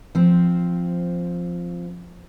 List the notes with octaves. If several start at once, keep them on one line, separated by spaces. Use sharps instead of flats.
F3 C4